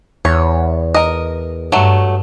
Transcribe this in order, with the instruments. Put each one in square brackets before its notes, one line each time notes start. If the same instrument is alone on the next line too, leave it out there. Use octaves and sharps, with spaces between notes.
[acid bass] E2 [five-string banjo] C#5
[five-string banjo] A#4 D#5
[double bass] G2 [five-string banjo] F#3 A3